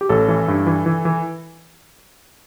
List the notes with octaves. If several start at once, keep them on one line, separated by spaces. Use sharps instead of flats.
G4
A1 A4
E3
G2
E3
E3
E3